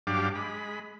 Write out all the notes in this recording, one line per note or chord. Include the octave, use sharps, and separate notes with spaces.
G2 F#3 D4 G4 F5 D6
G#3 B5